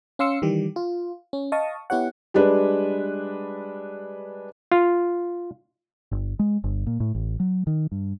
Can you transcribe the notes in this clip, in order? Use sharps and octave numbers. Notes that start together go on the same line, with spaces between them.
C#4 F5 C6 E6 C#7
D#3 E3 G3 G4
F4
C#4
D#5 F5 A5 C#6 D#6
B3 E4 G4 C#5 F#5
G3 G#3 D4 B4
F4
G1
G#3
G1
A#2
A2
A1
F#3
D#3
G2